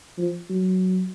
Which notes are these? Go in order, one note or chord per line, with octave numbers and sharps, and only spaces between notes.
F3
F#3